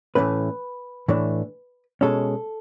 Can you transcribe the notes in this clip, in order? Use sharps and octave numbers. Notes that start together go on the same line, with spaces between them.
A2 E3 A3 C#4 B4
A2 E3 A3 D4
B2 G#3 C#4 A4